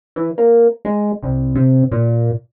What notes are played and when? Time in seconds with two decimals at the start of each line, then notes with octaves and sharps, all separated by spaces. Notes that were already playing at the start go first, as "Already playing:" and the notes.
0.16 E3
0.38 A#3
0.85 G#3
1.23 C2
1.55 C3
1.91 A#2